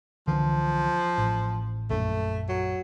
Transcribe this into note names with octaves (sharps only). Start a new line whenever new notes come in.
C2 D3 E3 F3
A1
A#1 F#2 A3
F#3